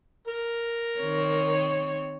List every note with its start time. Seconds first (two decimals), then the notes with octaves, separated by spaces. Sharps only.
0.28 A#4
1.00 D#3 C4 C#5